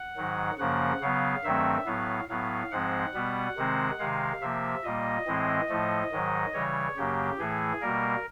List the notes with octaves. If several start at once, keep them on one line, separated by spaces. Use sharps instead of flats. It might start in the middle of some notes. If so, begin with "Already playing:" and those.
Already playing: F#5
G#2 D#3 F#3
F#2 C#3 F3 A#3 F#5
C#3 F#3 B3 F5
G2 D#3 F#3 A3 C4 E5
A2 F#3 B3 F5
A2 F#3 B3 F5
G#2 F3 G#3 C4 F#5
B2 G3 B3
C3 D#3 G#3 C4
C3 D#3 G#3 F5
C3 F3 A#3 E5
A#2 G3 A#3 D#5
A2 E3 G#3 C4
A2 F3 A3
G#2 D#3 F#3
C#3 E3 G3 C#5
F#2 C#3 F#3 A#3 G4
A2 E3 A3 G#4
B2 G3 A#3 A#4